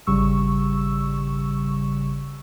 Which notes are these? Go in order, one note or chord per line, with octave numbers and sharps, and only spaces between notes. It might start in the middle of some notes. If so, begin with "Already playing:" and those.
G#1 C#3 G3 C#6 E6